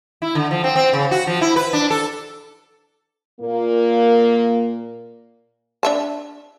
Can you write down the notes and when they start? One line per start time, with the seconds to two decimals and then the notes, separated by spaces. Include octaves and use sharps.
0.22 E4
0.35 D3
0.51 F3
0.64 C4
0.76 C4
0.93 C#3
1.11 F#4
1.27 F3
1.41 E4
1.56 B4
1.73 D4
1.90 A4
3.41 A#2 A#3
5.83 D4 E5 A5